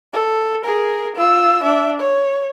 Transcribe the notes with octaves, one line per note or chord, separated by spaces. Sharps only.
A4
G#4 A#4
F4 E6
D4 E5
C#5